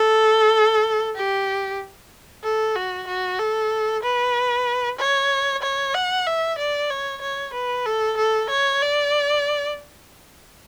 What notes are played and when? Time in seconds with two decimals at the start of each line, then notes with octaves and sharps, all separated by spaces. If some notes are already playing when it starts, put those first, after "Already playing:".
Already playing: A4
1.16 G4
2.43 A4
2.75 F#4
3.07 F#4
3.39 A4
4.03 B4
4.99 C#5
5.62 C#5
5.94 F#5
6.26 E5
6.59 D5
6.90 C#5
7.22 C#5
7.54 B4
7.86 A4
8.17 A4
8.50 C#5
8.82 D5